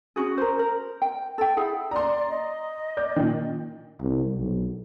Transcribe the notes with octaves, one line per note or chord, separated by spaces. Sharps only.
C#4 D#4 F#4 G#4
A#4 C5
A#4
G5
A4 G5
E4 G#4 F#5
D5 A#5 C6
D#5
D5 G6
A#2 D#3
C2
B1